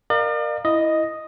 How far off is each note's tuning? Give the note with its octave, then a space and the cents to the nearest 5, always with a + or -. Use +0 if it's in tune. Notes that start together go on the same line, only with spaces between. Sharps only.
A#4 +0 D5 +45 F5 +0
E4 +0 D#5 +0